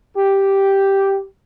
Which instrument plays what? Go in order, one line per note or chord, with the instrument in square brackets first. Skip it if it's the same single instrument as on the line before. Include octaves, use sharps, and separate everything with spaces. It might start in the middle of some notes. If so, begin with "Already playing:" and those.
[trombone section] G4